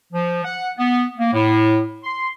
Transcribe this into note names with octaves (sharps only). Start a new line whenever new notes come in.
F3
F#5
B3
A#3
A2
C6